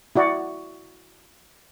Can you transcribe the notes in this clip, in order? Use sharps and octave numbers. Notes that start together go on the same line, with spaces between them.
E4 F#4 D5